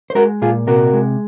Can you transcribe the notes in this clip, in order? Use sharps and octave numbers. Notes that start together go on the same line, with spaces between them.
C5
G#3 F#4 A#4
A#2 F4 G#4
C3 F#4 A#4
G#3